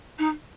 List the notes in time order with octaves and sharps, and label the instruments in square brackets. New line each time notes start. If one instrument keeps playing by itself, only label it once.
[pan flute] D#4